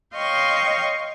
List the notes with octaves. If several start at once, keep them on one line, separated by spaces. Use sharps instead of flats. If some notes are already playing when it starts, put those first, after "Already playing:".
C#5 D#5 F5 G5 C6 C#6